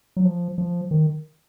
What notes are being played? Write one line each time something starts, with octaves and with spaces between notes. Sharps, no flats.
F#3
F3
F3
D#3